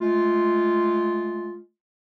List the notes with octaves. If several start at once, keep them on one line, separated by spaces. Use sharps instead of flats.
G#3 A3 F4